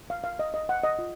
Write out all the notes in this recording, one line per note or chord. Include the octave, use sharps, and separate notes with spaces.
F5
F5
D#5
D#5
F#5
D#5
F4